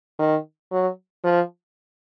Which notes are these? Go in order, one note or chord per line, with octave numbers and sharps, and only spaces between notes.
D#3
F#3
F3